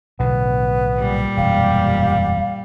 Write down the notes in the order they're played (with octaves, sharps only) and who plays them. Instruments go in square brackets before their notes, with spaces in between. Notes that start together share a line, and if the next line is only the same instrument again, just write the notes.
[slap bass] B1 A2 D3 [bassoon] B3
[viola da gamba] A#2 G3
[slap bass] E1 F#2 [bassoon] G4 [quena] F5